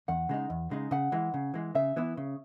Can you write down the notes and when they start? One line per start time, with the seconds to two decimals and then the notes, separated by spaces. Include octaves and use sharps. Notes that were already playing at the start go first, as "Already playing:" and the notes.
0.08 E2 F#5
0.29 C#3 G#3 D#4
0.50 E2
0.71 C#3 G#3 D#4
0.91 C#3 F#5
1.12 E3 G#3
1.34 C#3
1.54 E3 G#3
1.75 C#3 E5
1.96 E3 B3 E4
2.17 C#3